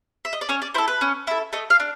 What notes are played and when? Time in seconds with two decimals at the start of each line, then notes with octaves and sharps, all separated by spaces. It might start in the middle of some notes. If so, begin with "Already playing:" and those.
0.25 E5
0.33 D#5
0.41 D5
0.49 C#4 C#5
0.62 D5
0.74 E4 A4 C5
0.88 B4
1.01 C#4
1.27 E4 A4
1.53 A3 D#5
1.70 F5
1.80 D4